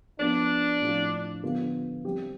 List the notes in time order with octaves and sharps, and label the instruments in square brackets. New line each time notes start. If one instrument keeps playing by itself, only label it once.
[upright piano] F3 B3 F4 [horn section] D4
[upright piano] A2 F3 C4 F4
D3 F3 B3 F4
G3 C4 G4